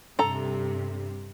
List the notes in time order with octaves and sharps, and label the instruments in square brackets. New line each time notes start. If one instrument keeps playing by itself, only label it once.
[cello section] G2 C3 [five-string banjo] A4 A#5